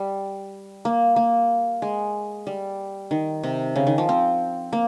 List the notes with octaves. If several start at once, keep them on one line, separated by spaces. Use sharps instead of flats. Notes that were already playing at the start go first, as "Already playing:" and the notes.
Already playing: G3
A#3
A#3
G#3
G3
D#3
C3
C#3
D#3
F3
C4
A#3